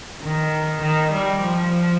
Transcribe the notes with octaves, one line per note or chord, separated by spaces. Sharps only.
D#3
D#3
G3
F3